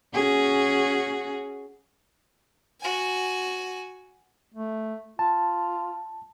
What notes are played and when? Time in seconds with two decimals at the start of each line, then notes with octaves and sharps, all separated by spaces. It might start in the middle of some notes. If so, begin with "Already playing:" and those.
0.14 C#4 F#4 G#4
2.81 F#4 G#5
4.54 A3
5.19 F4 A5